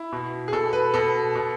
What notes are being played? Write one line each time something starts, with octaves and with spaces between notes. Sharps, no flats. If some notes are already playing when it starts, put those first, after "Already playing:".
Already playing: E4
B2
G#4
B2 A4
B4
B2 A4
B2